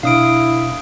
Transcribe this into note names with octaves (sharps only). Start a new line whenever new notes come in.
B2 D4 E4 F5 D#6 D7